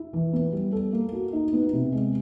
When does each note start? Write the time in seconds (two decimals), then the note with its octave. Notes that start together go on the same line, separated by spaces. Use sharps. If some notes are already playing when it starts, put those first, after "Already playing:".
Already playing: E4
0.13 E3
0.33 B3
0.53 G3
0.72 A4
0.93 A#3
1.12 F#4
1.33 D#4
1.53 B3
1.73 C3
1.92 G#3